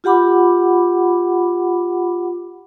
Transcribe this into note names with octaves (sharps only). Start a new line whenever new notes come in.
F4 G4 F#5 B5 D6